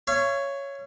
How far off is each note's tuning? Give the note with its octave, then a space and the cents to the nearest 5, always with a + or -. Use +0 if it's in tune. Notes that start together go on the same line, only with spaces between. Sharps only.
C#5 +0 F5 -45